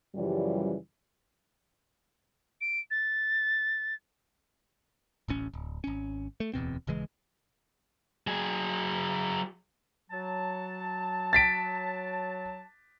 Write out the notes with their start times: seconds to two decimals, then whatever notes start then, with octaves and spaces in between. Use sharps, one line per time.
0.15 F#2 C#3 E3 F3 G3
2.61 D7
2.91 A6
5.28 D1 A1 C#4
5.54 D1
5.84 G#1 C#4
6.40 A3
6.54 D1 E2 B2 C4
6.87 D#1 C#3 E3 G#3
8.27 F#3 G#4
10.11 F#3 A5
11.33 A6 B6 D7